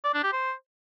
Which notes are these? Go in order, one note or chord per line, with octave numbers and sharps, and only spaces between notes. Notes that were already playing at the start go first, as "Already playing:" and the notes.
D5
D4
G4
C5